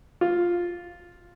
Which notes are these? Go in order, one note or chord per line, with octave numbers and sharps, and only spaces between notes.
F4